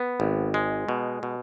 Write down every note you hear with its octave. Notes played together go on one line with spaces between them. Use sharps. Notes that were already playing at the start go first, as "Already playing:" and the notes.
Already playing: B3
G#1
G#3
B2
B2